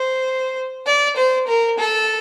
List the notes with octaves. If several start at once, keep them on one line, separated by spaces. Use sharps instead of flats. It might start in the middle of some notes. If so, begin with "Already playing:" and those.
Already playing: C5
D5
C5
A#4
A4